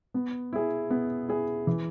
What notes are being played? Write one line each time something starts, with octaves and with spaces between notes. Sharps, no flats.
B3
E4 G#4
B3
E4 G#4
E3